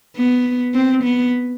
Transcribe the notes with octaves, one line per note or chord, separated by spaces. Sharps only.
B3
C4
B3